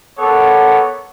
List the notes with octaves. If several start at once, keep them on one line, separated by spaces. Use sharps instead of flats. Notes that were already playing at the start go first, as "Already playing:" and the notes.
B3 A4 A#4 C#5 F#5 D6